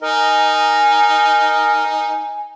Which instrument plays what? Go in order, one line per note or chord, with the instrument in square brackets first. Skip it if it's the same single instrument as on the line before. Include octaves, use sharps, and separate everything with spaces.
[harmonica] D#4 [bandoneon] A#4 D#5 [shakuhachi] G#5